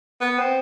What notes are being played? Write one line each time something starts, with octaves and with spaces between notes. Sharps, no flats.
B3
C4